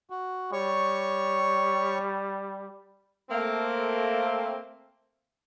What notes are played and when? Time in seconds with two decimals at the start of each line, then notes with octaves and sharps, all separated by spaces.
0.10 F#4
0.53 G3 C#5 C#6
3.30 A3 A#3 C4